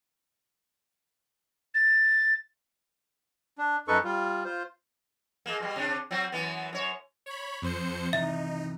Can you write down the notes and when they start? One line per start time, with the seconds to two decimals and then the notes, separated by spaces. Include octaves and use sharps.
1.74 A6
3.58 D4
3.88 F#2 D#4 A4 B4 C#6
4.04 G3 F4
4.45 F4 C5
5.46 G#3 A#3
5.60 B2 G3
5.76 C3 D4
6.11 F#3 C4 F#4
6.32 F#2 E3 B3
6.73 F#2 C#5
7.26 C#5 B5
7.62 F2 C5 C#7
8.13 C3 D#3 E3 D#4 E5